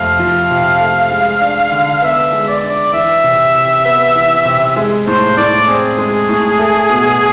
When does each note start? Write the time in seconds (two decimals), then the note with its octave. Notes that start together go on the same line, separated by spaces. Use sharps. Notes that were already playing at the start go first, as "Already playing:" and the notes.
Already playing: F2 C3 A3 F5
0.19 F3
0.50 C3
0.81 A3
1.12 G#3
1.41 D4
1.72 D3
2.02 B3 E5
2.33 G#3
2.48 D5
2.64 D4
2.93 E3 E5
3.24 C3
3.55 C3
3.85 B3
4.15 E3
4.45 C3
4.76 G#3
5.06 A2 C5
5.37 A2 D5
5.68 C4 G#4
5.98 G#3
6.29 A2
6.59 A3
6.90 B2